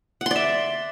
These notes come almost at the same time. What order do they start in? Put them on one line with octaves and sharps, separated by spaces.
F#5 C6 D5 E5